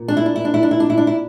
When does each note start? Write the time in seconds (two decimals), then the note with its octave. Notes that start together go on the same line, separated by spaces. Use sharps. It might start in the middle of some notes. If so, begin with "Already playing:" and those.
Already playing: A#2
0.08 D4
0.17 E4
0.26 D4
0.36 E4
0.45 D4
0.54 E4
0.63 D4
0.71 E4
0.80 D4
0.90 E4
0.97 D4
1.07 E4